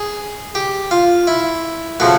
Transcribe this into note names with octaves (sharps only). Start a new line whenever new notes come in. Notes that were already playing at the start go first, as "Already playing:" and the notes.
Already playing: G#4
G4
F4
E4
C#3 F3 A3 F#4